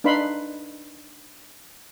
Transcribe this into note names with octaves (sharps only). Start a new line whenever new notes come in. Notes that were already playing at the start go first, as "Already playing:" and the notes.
D4 D#4 B4 F5 B5 C6